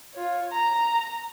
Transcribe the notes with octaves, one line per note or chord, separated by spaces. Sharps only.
F4 C#5
A#5